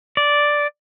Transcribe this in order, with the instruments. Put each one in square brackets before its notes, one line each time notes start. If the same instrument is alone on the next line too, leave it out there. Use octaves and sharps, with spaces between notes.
[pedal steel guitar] D5